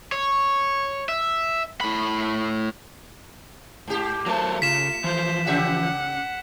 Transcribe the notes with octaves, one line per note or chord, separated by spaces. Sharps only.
C#5
E5
A2 B5
G#2 G4
F#3 A3 A#4 C5 A5
C#3 F4 B6 E7
E3 F3 C5
C#3 G4 E5 F#5